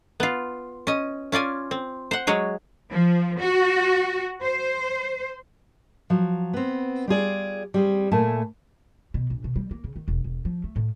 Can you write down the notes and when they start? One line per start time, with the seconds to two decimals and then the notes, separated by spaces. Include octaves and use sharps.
0.20 B3 F4
0.87 C#4 D#5
1.32 C#4 F4 D5 G#5
1.71 C4
2.11 C5 F#5
2.27 F#3 G#3 G#4 C#5
2.92 F3
3.39 F#4
4.43 C5
6.10 F3 F#3
6.53 B3 C4
7.08 G3 F4 G#4 D5
7.74 G3 C4 G#4
8.11 A#2 A3 E4 G#5 A5
9.14 B2
9.30 A#1
9.44 B2
9.56 G3
9.71 A#3
9.84 C#3
9.96 D#3
10.08 E1
10.24 E1
10.45 F3
10.64 A3
10.76 A2